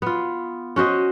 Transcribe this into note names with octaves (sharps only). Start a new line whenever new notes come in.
B3 F4
C#4 F#4 C5 D#5